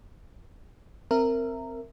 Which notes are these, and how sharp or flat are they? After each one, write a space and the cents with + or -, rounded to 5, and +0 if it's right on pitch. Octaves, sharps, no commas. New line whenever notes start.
C4 +0 A#4 -15 E5 +10